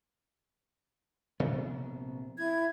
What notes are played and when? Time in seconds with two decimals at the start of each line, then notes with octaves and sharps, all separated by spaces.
1.40 A#1 C3 B3
2.37 E4 G#6